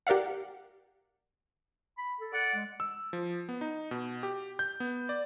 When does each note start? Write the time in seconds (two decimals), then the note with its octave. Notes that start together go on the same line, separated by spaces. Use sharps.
0.07 G4 A#4 D5 F5 F#5
1.98 B5
2.20 A4
2.33 D5 F#5
2.54 G#3
2.80 E6
3.13 F3
3.49 B3
3.61 D#4
3.91 B2
4.23 G4
4.59 G6
4.80 B3
5.09 D5